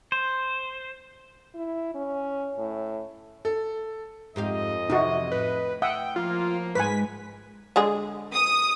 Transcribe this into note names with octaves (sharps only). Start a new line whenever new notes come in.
C5
E4
C#4
A2
A4
F2 G#2 G4 D#5 F5
C3 E3 D#4 F#4
A2 B4
E5 F#5 G5 D#6
F3 A#3 F4
G#2 G#3 B4 G#5 B6
D3 G#3 G#4
D#6